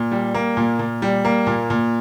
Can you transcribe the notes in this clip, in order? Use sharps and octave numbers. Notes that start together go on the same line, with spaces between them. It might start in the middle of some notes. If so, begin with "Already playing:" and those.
Already playing: A#2
G3
A#3
A#2
A#2
G3
A#3
A#2
A#2